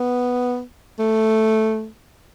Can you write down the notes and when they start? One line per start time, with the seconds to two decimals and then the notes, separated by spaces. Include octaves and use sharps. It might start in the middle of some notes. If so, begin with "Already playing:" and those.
Already playing: B3
0.99 A3